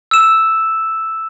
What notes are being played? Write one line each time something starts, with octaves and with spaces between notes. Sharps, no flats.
E6 E7